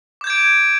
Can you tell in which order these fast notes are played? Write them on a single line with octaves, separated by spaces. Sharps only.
D6 G6 G#6 D7